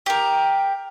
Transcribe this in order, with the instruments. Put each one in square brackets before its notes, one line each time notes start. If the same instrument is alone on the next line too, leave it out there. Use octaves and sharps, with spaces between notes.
[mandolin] G4 A#4